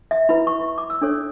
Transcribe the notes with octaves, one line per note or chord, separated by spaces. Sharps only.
E5
E4 B4 B5
C#6
D6
E6
D4 A4 C#5